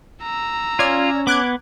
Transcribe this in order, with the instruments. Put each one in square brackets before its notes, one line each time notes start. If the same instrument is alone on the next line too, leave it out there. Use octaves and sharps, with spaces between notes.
[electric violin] A#5 E6
[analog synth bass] C#4 [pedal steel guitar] F4 [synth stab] D5 F6 G#6
[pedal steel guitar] B3 [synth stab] D6 F#6 G#6